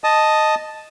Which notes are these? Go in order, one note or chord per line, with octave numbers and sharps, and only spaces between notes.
D#5 A5 D#6